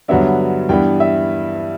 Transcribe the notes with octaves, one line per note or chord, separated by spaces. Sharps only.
G2 D3 F#3 B3 D4 E5
G2 E3 B3 D4 G5
E5